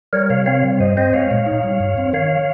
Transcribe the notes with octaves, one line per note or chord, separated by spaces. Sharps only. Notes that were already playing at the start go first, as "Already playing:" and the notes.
G3 A#4 C#5
C3 C#5 F5
C4 C#5 F5
G3
G2 C5 D#5
C4 C5 D#5
G#3 C#5 F5
A#2
D#4
G3
G2
C4
D#3 C#5 F5